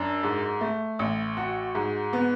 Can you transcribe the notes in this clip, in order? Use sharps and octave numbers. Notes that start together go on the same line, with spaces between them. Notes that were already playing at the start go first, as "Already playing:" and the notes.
Already playing: F#2 D4
G#2
A3
A1
F#4
G#2
B3